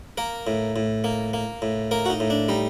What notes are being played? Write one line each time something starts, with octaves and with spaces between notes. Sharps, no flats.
A#3 A#4
A2
A2
A#3
A#3
A2
A#3 A#4
F#4
D#4
A2
D4
G3 D#4